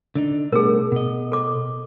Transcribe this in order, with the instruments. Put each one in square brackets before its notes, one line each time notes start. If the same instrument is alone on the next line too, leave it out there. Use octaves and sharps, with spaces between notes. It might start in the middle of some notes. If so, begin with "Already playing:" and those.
[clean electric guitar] D3 D4 D#4
[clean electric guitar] B2 G3 A3 [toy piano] G#4 A#4
[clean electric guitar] B2 D#5
[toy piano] A4 D6